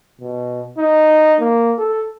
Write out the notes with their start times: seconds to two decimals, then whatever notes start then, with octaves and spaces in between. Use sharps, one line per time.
0.21 B2
0.78 D#4
1.40 A#3
1.78 A4